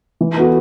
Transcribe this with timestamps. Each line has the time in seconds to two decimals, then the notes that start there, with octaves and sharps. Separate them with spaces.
0.21 E3
0.37 B3 F#4 A4